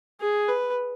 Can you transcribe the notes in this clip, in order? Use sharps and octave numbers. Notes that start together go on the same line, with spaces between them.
G#4
B4